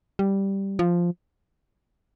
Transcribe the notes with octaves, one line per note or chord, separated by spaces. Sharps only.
G3
F3